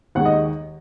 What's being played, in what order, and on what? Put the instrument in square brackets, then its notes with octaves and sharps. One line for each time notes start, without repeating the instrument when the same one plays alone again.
[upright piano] D#2 D#3 G#3 F#5
D#5